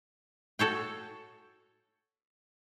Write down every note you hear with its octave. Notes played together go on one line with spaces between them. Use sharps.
F#4 A4 C#5 G5